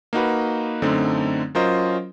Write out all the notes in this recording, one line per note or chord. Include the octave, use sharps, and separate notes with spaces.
A#3 D#4 F#4 B4
F#2 D3 A3 C4 D#4
F#3 C#4 F4 A#4 C5 D#5